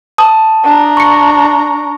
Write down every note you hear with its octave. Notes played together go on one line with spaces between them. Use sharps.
A5 D#6
D4 A#5
C#6 C#7